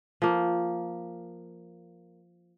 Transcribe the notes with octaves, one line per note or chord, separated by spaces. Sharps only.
F3 A#3